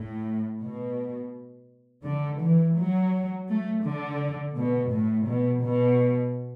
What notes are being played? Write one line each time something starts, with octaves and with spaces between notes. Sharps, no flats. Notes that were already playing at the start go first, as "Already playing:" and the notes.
Already playing: A2
B2
D3
E3
F#3
A3
D3
B2
A2
B2
B2